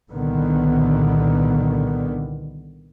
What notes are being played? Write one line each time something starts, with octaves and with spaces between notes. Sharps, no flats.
C2 A#2 D3 D#3 B3